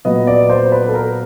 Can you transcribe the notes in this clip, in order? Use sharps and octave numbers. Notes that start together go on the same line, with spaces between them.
A#2 F#3 B3 D#5
D5
C5
B4
A4
A#4